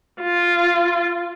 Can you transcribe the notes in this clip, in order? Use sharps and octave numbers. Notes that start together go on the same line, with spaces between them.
F4